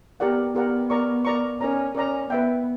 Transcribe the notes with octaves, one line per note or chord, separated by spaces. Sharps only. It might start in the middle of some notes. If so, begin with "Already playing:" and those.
B3 G4 A#4 D5 F#5
B3 G4 A#4 D5 F#5
A#4 D5 A#5 C#6
A#4 D5 A#5 C#6
C#4 A#4 D5 A#5
C#4 A#4 D5 A#5
B3 B4 E5 G5